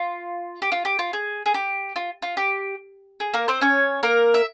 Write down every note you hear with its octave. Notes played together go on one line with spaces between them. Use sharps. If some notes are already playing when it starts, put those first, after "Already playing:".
Already playing: F4
G4
F4
G4
F4
G#4
G#4
G4
F4
F4
G4
G#4
A#3 A#4
C4 C5
C#4 C#5
A#3 A#4
E5